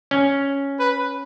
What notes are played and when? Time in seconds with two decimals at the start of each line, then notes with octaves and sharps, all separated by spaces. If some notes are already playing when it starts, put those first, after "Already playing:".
0.11 C#4
0.79 B4